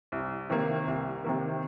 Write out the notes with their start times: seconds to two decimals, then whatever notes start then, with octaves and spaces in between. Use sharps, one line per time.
0.12 C2
0.50 C3 D#3 A#3
0.87 C2
1.24 C3 D#3 A#3